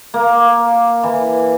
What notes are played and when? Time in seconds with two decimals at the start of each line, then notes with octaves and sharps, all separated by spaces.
0.14 A#3
1.03 E3